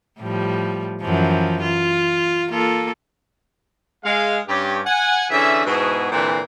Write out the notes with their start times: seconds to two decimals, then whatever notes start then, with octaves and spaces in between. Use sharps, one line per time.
0.20 A2 F3 G3
1.02 F#2 E3 F3
1.62 F4
2.50 A#3 F4 A4
4.04 G#3 F5
4.48 G2 C#4 G4
4.85 F#5 G#5
5.30 D3 E3 C#4 G#4 E5
5.65 G#2 B2 B3 E4 F#4 G#4
6.11 A#2 D3 E3 G3 C4